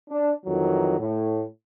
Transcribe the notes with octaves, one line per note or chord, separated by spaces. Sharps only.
D4
F2 D#3 E3 F#3
A2